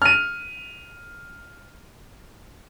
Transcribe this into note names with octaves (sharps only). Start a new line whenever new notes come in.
F6 D#7